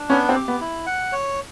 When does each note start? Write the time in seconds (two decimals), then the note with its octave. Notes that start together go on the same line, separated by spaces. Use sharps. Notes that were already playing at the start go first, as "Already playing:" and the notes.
Already playing: D4
0.10 B3 C#4
0.29 C4
0.35 G4
0.48 B3
0.61 E4
0.86 F#5
1.12 C#5